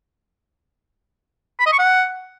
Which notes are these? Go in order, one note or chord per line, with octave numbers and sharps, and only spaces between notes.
B5
D#5
C#6
F#5